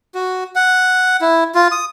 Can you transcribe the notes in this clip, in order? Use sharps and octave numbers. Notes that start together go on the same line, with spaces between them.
F#4
F#5
E4
F4
D#6